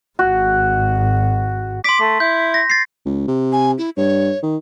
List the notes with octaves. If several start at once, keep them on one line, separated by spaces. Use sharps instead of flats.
G#1 G#2 F#4
C6 D6 B6
A3
E4 G6
A#6
A6 C7
C#2
C3
G#5
E4
G2 C#5
D#3